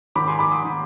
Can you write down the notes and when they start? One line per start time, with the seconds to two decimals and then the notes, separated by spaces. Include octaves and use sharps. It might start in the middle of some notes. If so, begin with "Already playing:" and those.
0.16 G#2 D#3 B5 D6
0.28 G#5 C6
0.39 B5 D6
0.52 C6 D#6
0.65 D#3